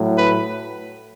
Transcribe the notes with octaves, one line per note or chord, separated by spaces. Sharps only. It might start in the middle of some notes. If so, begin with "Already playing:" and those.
Already playing: A2 F#3
B4